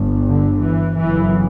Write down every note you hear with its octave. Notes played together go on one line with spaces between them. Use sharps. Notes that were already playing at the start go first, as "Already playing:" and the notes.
Already playing: G1 G2
D3
E3
G1 F#2 C#3 E3